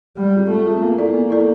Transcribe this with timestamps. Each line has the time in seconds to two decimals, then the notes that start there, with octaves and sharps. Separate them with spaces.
0.17 G3 G#3
0.34 C4 F4 G#4
0.49 G#3 A3
0.66 C4 F4 G#4
0.82 A#3 B3
0.98 E4 A4 D5
1.14 B3
1.30 E4 A4 D5